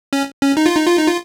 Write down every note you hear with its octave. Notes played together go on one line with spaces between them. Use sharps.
C#4
C#4
D#4
F4
D#4
F4
D#4
F4